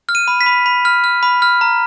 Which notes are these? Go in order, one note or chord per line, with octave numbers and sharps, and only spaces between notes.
F6
D#7
B5
B6
B5
B5
F6
F6
B5
F6
A#5